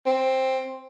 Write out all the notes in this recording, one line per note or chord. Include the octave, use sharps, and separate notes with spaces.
C4